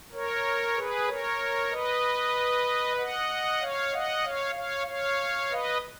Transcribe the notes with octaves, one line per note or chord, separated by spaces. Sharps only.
A#4 C#5
G#4 B4
A#4 C#5
B4 D#5
D#5 F#5
C#5 F5
D#5 F#5
C#5 F5
C#5 F5
C#5 F5
B4 D#5